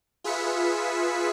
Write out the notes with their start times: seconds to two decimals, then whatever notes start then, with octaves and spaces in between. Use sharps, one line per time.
0.24 F4 G#4 B4 E5 B6 C#7